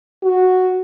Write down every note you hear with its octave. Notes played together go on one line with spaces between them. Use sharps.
F#4